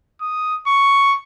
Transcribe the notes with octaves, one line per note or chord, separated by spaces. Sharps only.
D#6
C#6